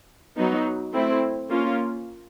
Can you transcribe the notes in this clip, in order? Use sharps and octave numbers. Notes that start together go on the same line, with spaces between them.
F#3 B3 D#4
A3 C4 E4
A#3 C#4 F4